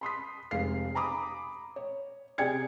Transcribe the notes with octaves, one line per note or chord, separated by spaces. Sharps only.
B5 C6 D#6 B6
F1 G#3 F5 C7
G#5 A#5 B5 D6 D#6
C#5
C3 G#4 D5 G5 G#6 C#7